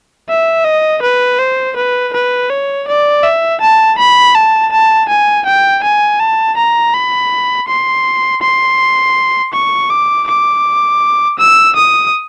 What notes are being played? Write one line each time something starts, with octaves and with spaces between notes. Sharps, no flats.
E5
D#5
B4
C5
B4
B4
C#5
D5
E5
A5
B5
A5
A5
G#5
G5
G#5
A5
A#5
B5
C6
C6
C#6
D6
D6
E6
D#6